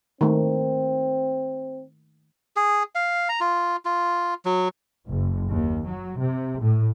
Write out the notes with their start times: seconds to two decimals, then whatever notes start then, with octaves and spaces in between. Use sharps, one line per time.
0.21 D#3 A3 C4
2.56 G#4
2.95 F5
3.29 A#5
3.40 F4
3.85 F4
4.45 F#3
5.07 F#1
5.50 D#2
5.88 F#3
6.19 C3
6.62 A2